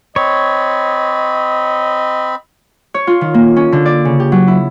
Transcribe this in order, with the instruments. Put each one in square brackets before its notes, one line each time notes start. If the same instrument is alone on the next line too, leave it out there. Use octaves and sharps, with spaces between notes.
[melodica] C4 B5 [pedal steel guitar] C#5 [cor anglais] D#5
[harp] C#5
F4
D#3
A#3
C#4
D3
D5
C#3
G4
F#3
E4